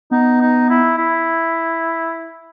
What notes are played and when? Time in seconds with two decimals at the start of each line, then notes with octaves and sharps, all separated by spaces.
0.11 B3 D#4
0.41 D#4
0.70 E4
0.98 E4